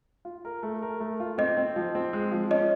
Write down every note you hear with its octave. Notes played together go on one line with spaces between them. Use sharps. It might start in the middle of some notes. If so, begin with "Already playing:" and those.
F4
A#4
A3
A#4
A3
F4
C4 D#5
C4
F3
C4
G#3
F3
C#4 D#5